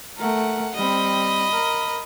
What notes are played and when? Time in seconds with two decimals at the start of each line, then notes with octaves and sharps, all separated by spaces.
0.18 A3 A#4 F#5
0.75 G3 C4 D#5 B5
1.51 A#4